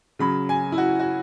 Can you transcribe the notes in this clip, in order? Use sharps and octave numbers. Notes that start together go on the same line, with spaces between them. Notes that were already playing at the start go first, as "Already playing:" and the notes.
C#3 F#3 B5
G#5
E4
F#4
F#4